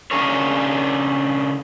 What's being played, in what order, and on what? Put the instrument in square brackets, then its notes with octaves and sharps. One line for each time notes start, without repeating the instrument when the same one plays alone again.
[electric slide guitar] C#3 D4 G#4 A#4 C#5